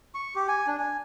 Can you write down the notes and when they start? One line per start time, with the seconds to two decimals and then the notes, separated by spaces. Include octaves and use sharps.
0.15 C#6
0.35 G4
0.48 G#5
0.67 D4
0.80 G#5